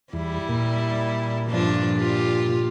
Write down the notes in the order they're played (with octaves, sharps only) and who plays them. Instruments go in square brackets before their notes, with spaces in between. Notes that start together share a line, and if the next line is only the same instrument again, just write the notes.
[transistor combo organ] E2 [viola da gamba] G3 E4
[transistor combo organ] A#2
[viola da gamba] G2 F3 D4
F4 G4